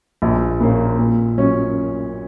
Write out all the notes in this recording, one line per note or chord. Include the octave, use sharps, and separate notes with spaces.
A#1
A#2 A#3 C#4
A#2
F#3 C#4